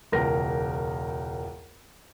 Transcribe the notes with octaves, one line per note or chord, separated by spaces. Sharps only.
E1 C#2 A#4 A#6